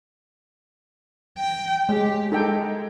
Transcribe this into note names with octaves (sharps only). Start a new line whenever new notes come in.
G5
G#3 G4
G#3 D#4 A4 G5